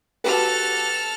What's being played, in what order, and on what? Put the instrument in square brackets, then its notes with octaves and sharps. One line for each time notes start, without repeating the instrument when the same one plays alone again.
[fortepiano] F#4 G4 B4 [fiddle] A4 F6